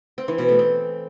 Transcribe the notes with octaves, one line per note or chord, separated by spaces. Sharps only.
C4
E3
B2
A3
C4